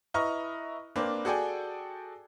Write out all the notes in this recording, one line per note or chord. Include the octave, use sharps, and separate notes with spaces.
E4 B4 D#5 A#5 C#6 F6
A#3 C4 D4 B4
F#4 G#4 A4 D5 G5 G#5